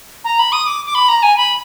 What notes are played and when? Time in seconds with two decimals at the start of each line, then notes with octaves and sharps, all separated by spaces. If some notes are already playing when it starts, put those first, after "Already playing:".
0.24 A#5
0.39 B5
0.52 D#6
0.67 D6
0.86 D6
0.95 B5
1.08 A#5
1.23 G#5
1.37 B5